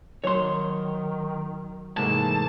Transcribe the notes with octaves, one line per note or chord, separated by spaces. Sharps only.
D#3 F#3 C#5 C6
G#2 C3 E3 A3 A#3 A5